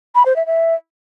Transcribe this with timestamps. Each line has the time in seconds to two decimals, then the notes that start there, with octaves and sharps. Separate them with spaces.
0.15 B5
0.26 C5
0.36 E5
0.46 E5